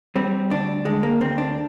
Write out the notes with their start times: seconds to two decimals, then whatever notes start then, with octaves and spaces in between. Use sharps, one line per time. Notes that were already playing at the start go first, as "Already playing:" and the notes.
0.16 G3 C4
0.50 D2 D4
0.85 D3 G#3
1.03 A#3
1.21 D2 C4
1.38 D4